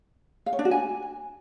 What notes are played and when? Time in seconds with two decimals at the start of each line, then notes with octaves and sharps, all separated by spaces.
0.46 F5
0.53 C#5
0.59 D4
0.65 F#4
0.71 G#5